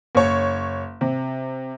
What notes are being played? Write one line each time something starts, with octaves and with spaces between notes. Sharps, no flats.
F#1 C#5
C3